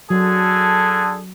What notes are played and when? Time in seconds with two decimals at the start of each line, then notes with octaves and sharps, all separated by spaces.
0.10 D3 F#3 G#4 A4